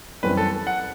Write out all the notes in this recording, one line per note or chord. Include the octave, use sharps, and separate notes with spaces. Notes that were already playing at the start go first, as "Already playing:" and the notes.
F#2 E3 G3 C4 B4
A4
F#5